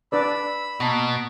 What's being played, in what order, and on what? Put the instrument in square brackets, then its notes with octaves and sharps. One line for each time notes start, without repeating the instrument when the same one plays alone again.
[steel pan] D4 B4 D5 [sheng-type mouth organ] B5 E6
[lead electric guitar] B2 [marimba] A#3 A5 A#6